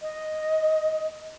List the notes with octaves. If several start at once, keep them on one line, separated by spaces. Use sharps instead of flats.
D#5